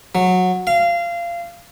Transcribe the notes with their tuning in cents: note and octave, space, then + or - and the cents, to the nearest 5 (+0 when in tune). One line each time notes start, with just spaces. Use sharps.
F#3 -15
F5 -25